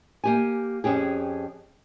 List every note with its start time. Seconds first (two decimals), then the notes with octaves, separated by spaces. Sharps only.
0.24 A#3 G4 G#5
0.84 F2 C#4 G4 G#4